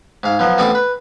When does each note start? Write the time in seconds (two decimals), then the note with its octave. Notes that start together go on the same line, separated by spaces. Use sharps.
0.23 G#2 F5
0.39 B2 F3 F#3
0.58 A1 B2 C4 A4 D#5 D6
0.75 B4